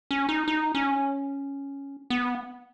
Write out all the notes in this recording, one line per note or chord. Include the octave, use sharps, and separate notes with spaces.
C#4
D#4
D#4
C#4
B3